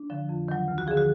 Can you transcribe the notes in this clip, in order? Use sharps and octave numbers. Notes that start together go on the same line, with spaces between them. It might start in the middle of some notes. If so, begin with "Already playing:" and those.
Already playing: D4
D3 F3
F2
D#3 F#3
D2
F#4
D3 F3 G#4
F#4